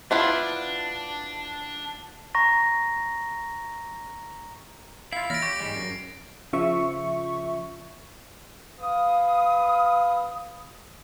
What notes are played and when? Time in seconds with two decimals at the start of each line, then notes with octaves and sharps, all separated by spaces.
0.11 B3 D4 E4 F4
2.35 A#5 C#6 A#6
5.13 E4 F4 F5 C7
5.30 E3 F6 A#6 B6 D7
5.42 G4 C#6
5.60 G#2 G3 G#3
5.76 F#2
6.53 C#3 F3 E5 C#6
8.79 B4 F5 D#6